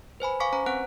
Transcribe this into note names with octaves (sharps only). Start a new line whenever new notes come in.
B4 C5 G#5 B5
F5 G#5 C#6 D6 B6
C#4 C5 A#5
C4 B4 F#5 F#6 D7